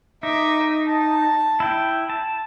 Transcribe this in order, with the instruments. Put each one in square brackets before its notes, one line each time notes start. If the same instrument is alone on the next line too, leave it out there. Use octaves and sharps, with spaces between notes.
[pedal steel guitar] D#4 [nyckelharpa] E5 D6
[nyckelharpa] A5
[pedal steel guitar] E4 G5
A5